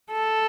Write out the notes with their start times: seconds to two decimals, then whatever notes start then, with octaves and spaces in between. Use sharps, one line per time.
0.12 A4